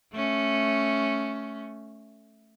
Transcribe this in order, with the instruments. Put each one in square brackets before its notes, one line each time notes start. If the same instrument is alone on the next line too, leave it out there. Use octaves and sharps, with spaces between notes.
[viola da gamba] A3 C#4